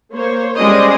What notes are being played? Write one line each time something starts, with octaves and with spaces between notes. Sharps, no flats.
A#3 C5 C#5
G3 G#3 C#4 C5 D5 D#5